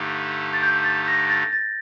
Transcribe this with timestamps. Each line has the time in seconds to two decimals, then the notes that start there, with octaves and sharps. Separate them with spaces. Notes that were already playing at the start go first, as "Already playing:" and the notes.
Already playing: G2 D3 A3 D#4 G4
0.53 A6
0.62 G6
0.84 A6
1.08 A#6
1.30 A6
1.53 A6